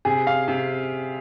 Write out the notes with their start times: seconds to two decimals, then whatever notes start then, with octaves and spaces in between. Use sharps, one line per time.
0.05 C3 G#4
0.27 F5
0.48 C3